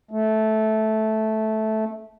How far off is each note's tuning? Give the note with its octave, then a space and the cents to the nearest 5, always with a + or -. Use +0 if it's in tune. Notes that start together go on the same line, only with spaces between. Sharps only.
A3 -10